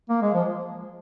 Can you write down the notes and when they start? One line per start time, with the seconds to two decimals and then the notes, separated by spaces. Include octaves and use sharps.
0.09 A#3
0.22 G#3
0.34 F3